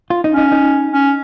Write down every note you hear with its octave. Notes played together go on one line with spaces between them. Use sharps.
F4
D#4
C#4
D#4
D#4
C#4